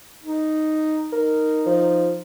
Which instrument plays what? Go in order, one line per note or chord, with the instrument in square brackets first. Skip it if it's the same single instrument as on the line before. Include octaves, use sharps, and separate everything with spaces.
[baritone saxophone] D#4
[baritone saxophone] D#4 [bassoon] A#4
[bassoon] F3